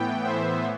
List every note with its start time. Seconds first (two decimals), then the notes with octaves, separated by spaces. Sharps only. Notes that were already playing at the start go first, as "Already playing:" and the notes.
Already playing: A2 E3 B3 G5
0.24 C5 E5